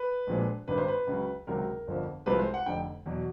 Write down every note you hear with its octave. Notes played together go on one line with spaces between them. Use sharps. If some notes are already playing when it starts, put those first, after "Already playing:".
Already playing: B4
A#1 A#2 F3 G#3
G#1 G2 D#3 B4
C5
B4
C#2 C#3 F#3
C#2 C3 D#3 F#3 A#4
G1 F2 D3 F3
C2 C3 F3 G#3 B4
C5
F#5
F1 F2 D3 G5
E2 B2 F#3